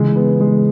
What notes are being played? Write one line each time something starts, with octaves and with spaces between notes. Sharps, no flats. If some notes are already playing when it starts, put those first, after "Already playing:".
Already playing: C#3 E3 G#3
B3
G#3